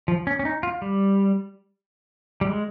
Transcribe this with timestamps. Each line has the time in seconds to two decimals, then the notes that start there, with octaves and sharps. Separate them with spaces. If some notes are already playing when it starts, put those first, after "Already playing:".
0.08 F3
0.27 C#4
0.39 C#4
0.45 D#4
0.63 F4
0.82 G3
2.41 G3
2.46 G#3